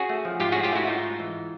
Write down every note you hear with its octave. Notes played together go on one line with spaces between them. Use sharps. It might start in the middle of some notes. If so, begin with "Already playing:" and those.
Already playing: C#4 F#4 G#4
A3
F3
G#2 F4 G4
C#4 F#4 G#4
F4 G4
A3 E4 F#4
G#2 D#4 F4
G#3
E3